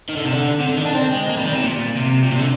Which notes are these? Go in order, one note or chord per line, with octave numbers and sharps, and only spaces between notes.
D#3
D3
C3
D3
C3
D3
D#3
D4
C4
G#3
A#3
G3
D#3
C3
A#2
C3
A#2
C3
D3